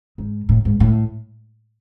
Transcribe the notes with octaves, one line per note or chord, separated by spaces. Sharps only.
G#2
A2
G#2
A2